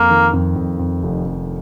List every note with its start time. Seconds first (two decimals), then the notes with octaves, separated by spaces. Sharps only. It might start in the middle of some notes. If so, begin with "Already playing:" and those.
Already playing: F2 A#3
0.10 D#3
0.33 F2
0.56 F2
0.79 F2
1.03 F1
1.26 F1